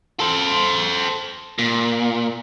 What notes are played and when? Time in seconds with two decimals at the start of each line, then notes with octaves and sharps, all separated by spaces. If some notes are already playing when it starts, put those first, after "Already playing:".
0.20 A4 C5
1.58 A#2